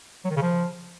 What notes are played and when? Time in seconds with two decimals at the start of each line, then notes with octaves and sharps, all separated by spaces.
0.25 F#3
0.31 D#3
0.36 C#3
0.42 F3